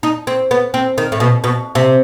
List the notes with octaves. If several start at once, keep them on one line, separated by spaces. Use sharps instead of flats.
D#4
C4
B3
C4
D#3
A2
B2
B2
C3